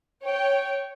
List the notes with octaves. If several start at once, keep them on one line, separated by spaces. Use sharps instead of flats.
C#5 G5